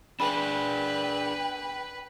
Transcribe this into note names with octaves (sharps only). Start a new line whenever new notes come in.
D4 G#4 B4 G5 B5